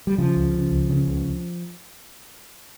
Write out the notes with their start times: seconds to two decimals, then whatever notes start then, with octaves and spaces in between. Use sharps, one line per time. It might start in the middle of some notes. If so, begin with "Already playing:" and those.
0.07 G3
0.18 C#3 F3
0.36 C#2
0.54 C#3
0.71 C#2
0.89 C#3
1.07 C#2